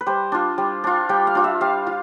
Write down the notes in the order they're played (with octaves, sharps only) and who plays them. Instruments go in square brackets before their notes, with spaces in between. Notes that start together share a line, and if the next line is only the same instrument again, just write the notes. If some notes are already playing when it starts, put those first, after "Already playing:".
[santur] B4
G3 C5
D4 F4
G3
D4 F4
G3 G5
F5
D4 F4
E5
G3 F5
F4